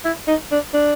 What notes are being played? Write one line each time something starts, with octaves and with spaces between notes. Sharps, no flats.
E4
D#4
D4
D4